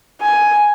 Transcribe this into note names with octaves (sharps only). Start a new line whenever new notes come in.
G#5